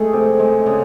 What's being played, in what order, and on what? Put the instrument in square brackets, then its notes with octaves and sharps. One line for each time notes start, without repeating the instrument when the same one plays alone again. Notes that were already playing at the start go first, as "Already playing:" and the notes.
Already playing: [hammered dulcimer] G#3 G#4 [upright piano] A3
[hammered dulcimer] C3
G#3
C#3